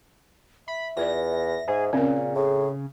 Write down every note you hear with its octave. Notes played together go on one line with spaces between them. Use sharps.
E5 B5
E2 F4 B4 D5 A#6
G#2 G#4
A#2 C#3 C4 C#4 A#4
A2 G#4